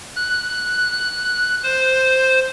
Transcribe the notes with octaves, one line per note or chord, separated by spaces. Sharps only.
F#6
C5